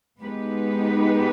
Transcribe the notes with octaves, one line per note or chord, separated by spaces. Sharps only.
G#3 B3 D#4 G4 B4